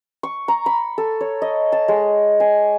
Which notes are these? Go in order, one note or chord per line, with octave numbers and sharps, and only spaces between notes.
C#6
A#5
B5
A4
C#5
D#5
A5
G#3
G#5